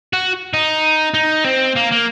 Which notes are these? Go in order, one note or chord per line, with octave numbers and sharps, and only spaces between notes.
F#4
D#4
D#4
C4
A#3
A#3